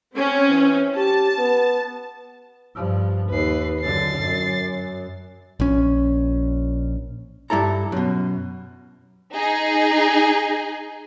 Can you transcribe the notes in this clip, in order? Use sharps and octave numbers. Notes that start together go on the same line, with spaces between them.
C4 C#4
E3
G4 A5
B3
G2 F3
D#2 B4 C7
F#2 D3 A6 C7
F#2
A#1 C#4
G2 E4 A4 A#5
F#2 B2
D#4 G#4